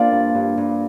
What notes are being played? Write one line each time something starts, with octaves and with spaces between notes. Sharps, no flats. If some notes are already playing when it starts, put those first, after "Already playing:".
Already playing: A#3 D4 F4 A#4 C5 D5 F5
G2
G2
G2